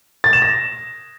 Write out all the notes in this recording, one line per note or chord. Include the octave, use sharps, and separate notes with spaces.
A6
E7
A#6